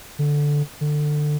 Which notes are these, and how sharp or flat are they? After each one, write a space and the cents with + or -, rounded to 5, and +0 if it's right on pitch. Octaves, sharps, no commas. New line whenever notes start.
D3 -5
D3 +20